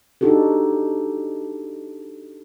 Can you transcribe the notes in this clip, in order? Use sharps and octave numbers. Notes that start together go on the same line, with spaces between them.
D4 D#4 F#4 G4 A4